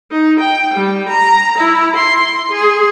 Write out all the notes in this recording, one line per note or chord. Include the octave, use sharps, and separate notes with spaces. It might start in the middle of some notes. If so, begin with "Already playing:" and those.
D#4
G5
G3
A#5
E4
C6
G#4